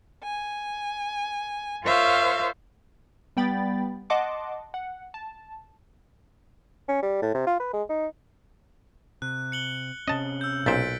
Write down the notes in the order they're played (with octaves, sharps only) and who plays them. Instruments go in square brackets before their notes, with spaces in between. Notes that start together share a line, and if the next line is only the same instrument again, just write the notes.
[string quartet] G#5
F4 A#4 C5 C#5 E5 F5
[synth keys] G3 B3 G5 B5 A6
D#5 F#5 A5 C6 D6
F#5
A5
[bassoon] C#4
G3
A2
C3
F4
B4
G#3
D#4
[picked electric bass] C3 [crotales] F#6
[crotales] C#7 F#7 G7
[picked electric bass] C3 C#4 [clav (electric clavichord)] D#5 A5
[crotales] E6 G6
[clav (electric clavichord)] B1 A#2 C5 [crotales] A6 B6 D7